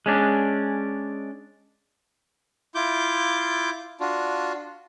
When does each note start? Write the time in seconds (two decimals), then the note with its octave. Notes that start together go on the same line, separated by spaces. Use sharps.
0.06 G#3 C#4 D4
2.75 E4 F4 D6 G6
4.00 D4 F4 F#4